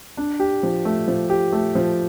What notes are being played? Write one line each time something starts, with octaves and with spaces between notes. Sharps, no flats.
D4
G4
F3
A3
F3
G4
A3
F3